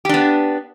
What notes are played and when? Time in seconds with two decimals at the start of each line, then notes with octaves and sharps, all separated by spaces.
0.05 G4
0.09 D4
0.14 B3